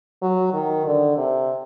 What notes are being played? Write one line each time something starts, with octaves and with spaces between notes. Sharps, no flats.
F#3
D#3
D3
C3